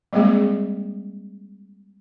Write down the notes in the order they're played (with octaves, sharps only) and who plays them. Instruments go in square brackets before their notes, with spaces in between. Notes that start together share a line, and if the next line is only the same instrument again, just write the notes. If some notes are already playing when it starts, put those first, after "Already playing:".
[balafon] G3 G#3 A#3 C4 G#4